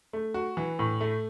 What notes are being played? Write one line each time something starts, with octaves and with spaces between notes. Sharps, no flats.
A3
F#4
E3
A2
A3